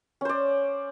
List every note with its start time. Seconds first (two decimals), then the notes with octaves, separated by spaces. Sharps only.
0.21 C#4
0.25 C5
0.29 D5